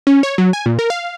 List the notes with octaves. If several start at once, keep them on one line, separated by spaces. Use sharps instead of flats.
C#4
C#5
F#3
G#5
A#2
A#4
F5